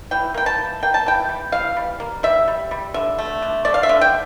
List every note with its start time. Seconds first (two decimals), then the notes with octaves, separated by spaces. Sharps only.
0.11 E3 G5
0.34 A#3 G5
0.46 A5
0.58 E3
0.83 A#3 G5
0.94 A5
1.06 E3 G5
1.29 G3
1.52 E3 F5
1.77 G3
2.00 A#3
2.23 G3 E5
2.48 G3
2.71 G3
2.94 D3 E5
3.19 A3
3.42 D3
3.65 A3 D5
3.74 F5
3.83 E5
3.89 D3
4.01 G5